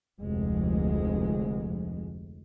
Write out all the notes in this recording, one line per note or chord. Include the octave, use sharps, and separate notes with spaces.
F1 D2 G#3